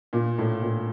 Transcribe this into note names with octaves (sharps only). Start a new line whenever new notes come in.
A#2
A2
A#2